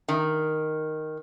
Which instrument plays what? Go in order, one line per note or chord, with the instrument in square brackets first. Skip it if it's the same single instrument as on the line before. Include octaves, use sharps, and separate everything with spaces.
[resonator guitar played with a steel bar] D#3